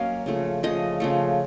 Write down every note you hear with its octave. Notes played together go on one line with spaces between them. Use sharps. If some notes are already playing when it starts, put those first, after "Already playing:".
Already playing: F#3 A#3 C#4 C#5 D#5 F5
C#3 F3 A3
C#3 F3 A3 D#5
C#3 F3 A3